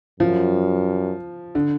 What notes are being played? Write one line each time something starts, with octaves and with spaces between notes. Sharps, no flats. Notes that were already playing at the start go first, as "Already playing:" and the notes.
F#2 F3
D3